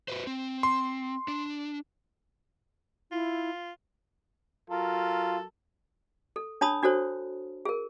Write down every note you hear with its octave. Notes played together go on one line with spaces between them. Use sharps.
F#4 B4 C5
C4
C6
D4
E4 F4
F#3 F4 A4 A#4
A4
D4 C#5 A5 B5 D#6
D4 F#4 A4 C5 C#5
G#4 A#4